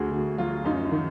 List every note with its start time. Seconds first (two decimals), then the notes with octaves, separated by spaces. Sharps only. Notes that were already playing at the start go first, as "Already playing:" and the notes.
Already playing: D2 D3 F#4 G#4
0.11 D2
0.38 F#3 F4
0.65 F#2 D#4
0.91 D#3